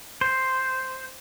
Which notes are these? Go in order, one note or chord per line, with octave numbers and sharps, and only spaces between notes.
C5